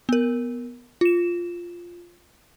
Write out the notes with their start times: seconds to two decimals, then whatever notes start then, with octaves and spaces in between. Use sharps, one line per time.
0.09 B3 A#4
1.01 F4 E7